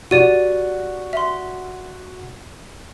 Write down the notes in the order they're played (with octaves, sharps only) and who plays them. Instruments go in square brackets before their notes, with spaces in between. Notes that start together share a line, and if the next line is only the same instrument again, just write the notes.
[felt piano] F#4 [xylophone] G4 D5 D#7
[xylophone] E5 C6